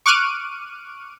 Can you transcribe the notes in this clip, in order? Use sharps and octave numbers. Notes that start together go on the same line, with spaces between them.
C#6 D6 F6 F#6 D7 D#7